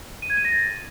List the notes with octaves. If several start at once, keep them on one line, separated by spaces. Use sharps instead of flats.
D#7
G#6
D#7
A#6
A6